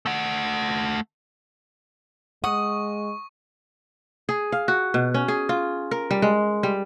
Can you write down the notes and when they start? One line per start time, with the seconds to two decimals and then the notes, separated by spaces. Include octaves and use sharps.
0.06 A3 F#5
2.44 G#3 F#5 C#6 D#6
4.29 G#4
4.52 F5
4.68 F#4
4.94 B2
5.14 C#4
5.28 G#4
5.49 F4
5.91 A#4
6.11 G3
6.22 G#3
6.63 G3